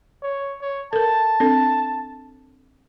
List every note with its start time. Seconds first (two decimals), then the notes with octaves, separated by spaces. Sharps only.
0.22 C#5
0.62 C#5
0.93 A4 A#4 A5
1.40 C4 D4 A4